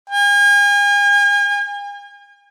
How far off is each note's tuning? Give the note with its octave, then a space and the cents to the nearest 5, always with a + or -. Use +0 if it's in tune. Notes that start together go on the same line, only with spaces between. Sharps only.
G#5 -40